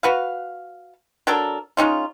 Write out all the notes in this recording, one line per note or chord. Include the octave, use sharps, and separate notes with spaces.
F#4 B4 F5
F#3 D4 A4 A#4
G#3 C#4 D#4 F4